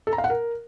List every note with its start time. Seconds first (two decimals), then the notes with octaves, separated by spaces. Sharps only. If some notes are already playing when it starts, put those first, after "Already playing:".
0.07 A4
0.13 A#5
0.18 F5
0.24 F#5
0.30 A#4